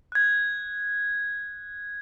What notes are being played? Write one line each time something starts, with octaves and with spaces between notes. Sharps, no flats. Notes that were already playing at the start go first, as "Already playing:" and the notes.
F#6 G#6